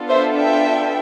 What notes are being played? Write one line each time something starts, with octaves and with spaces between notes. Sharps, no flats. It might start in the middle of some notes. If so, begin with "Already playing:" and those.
Already playing: B3 D4 F4 A4
C5 E5
E5 G5